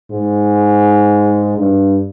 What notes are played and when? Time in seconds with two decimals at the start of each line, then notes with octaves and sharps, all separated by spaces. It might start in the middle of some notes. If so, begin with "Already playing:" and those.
0.11 G#2
1.58 G2